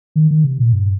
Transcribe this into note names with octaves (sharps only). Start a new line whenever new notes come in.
D#3
D#3
C3
A#2
G2